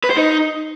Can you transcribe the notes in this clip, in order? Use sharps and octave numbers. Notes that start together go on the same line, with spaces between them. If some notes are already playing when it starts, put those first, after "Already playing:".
B4
C5
D#4